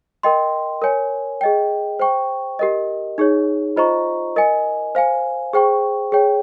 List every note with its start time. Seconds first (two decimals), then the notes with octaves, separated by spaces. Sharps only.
0.23 A#4 D#5 G5 C6
0.82 A#4 C#5 G#5
1.41 G#4 D#5 G5
2.00 C5 G5 C#6
2.59 G4 A#4 D#5
3.18 D#4 G#4 C#5
3.76 F4 C5 D#5 A#5 C#6
4.36 A#4 D#5 G#5
4.95 C5 F5 G#5
5.53 G#4 C5 G5 C#6
6.12 G#4 C#5 G5